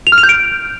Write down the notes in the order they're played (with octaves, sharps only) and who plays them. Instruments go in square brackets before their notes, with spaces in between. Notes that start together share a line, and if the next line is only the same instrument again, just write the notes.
[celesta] F7
F6
F7
G6
D7